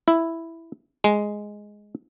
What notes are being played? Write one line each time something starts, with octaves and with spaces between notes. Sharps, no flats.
E4
G#3